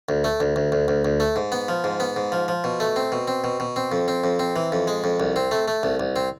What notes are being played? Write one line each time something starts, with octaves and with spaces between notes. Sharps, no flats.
D2
A3
D2
D2
D2
D2
D2
A3
G#2
B3
F3
G#2
B3
G#2
F3
F3
B2
A3
C4
B2
C4
B2
B2
C4
F2
C4
F2
C4
E3
F2
G#3
F2
C2
C4
A3
A3
C2
C2
C4